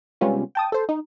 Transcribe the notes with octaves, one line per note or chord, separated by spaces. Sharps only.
C3 G3 G#3 B3 C#4 F4
G5 A5 D#6
A4 C5
D#4